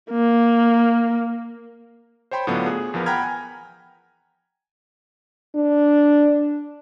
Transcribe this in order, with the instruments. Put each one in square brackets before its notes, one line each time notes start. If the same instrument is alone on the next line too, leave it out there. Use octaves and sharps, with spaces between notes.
[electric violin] A#3
[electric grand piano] C5 C#5 G5 B5 C6
A2 D3 F#3 B3 D4 F4
G#4
E2 F3 B3 A#4
F#5 G5 A#5 B5 F6 G#6
G#5
[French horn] D4